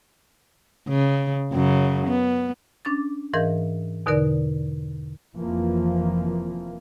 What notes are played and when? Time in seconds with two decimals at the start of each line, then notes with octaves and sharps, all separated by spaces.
0.88 C#3
1.52 F#2 C#3
2.07 B3
2.85 C#4 D4 D6 A6
3.34 G#2 E3 A#4 D#5 F5 G6
4.06 E2 B2 D3 D#4 A#4 D5
5.36 F1 F2 E3 F3 A#3